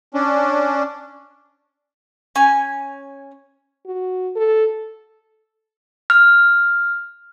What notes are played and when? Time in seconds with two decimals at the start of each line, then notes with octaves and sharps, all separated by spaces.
0.14 C#4 D4
2.36 C#4 G#5
3.86 F#4
4.36 A4
6.10 F6